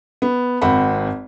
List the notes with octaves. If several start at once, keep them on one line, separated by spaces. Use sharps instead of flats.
B3
G#1 C4 F#5 B5